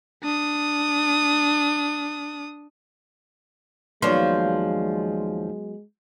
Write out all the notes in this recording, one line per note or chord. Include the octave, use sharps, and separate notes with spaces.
D4 D#6
D#2 F3 F#3 G#3 B3 C#5 D5 C6